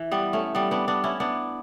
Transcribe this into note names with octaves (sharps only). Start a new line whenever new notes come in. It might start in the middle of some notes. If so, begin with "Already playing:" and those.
Already playing: E3
G3 B3
A3 C#4
G3 B3
B3 D4
B3 D4
C#4 E4
B3 D4